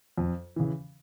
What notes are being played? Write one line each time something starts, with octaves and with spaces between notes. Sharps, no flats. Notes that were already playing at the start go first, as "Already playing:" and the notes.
F2
C#3 E3